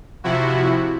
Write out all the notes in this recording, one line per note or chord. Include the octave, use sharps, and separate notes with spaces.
C3 F3 E4 F#4